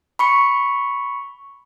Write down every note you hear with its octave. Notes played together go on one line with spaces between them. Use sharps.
B5 C#6 C#7